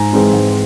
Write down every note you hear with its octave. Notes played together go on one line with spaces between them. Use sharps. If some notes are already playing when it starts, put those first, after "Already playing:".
Already playing: G#2 G#5 A#5
E3 G#3 C4 D#4
G#2